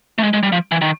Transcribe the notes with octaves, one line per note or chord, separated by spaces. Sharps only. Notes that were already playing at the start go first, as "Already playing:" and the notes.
A3
G#3
G#3
G3
F3
E3
D#3